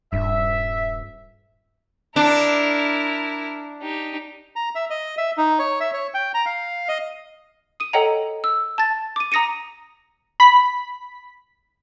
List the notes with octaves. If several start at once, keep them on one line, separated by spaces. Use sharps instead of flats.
D#1 G2 E5
D4 E4 A#4
D#4 G4
A#5
E5
D#5
E5
D#4
C#5
E5
C#5
G5
A#5
F5
D#5
D#6 D#7
A4 C#5 D#5 F#5 G5 A#5
E6
A5 A6
D6 D#7
A#5 D#6 A#6 C#7 D#7
B5 B6